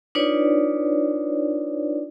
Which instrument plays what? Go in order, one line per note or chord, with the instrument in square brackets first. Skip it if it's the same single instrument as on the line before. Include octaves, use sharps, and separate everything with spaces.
[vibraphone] D4 D#4 F4 B4 C#5 D5